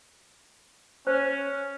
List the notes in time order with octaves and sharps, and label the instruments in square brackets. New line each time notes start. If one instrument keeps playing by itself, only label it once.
[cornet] C#4 [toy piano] C5